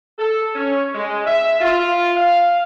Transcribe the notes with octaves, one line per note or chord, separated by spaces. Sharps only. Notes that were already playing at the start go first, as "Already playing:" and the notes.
A4
C#4
G#3
E5
F4
F5